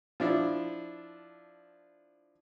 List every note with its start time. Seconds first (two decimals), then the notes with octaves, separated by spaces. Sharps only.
0.20 F3 D4 E4